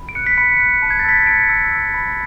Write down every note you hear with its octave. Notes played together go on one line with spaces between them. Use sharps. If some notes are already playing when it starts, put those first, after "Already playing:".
Already playing: B5
D7
F#6 C#7
B6
B5 C#7
F#6
A5
G#6
A6
E6 B6
C#7
A5 D7
E6
E6
B5